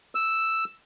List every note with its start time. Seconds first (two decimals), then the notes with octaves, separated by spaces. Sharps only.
0.15 E6